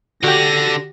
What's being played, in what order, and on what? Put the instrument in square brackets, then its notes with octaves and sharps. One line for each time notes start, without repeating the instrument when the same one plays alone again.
[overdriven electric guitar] D3 [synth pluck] F#4 G4 [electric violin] A#6